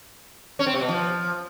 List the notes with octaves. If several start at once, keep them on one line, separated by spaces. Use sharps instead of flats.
C#4
C4
C3
B2
F3